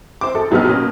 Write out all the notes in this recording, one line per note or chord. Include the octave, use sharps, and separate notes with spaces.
C5 D6
F#2 A4
F2 F#3 G3 B3 D#4 F6
B2 A#3 C#4